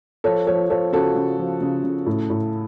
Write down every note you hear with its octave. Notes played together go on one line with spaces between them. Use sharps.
F3 A4 C#5
F3 A4 C#5
F3 A4 C#5
C#3 F#4 A4
C#3
F3
C#3
C#3
A2
A2